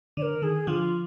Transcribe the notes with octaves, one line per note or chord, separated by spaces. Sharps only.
D3 D5
A#4
D#3 G#4
D3 F3 F4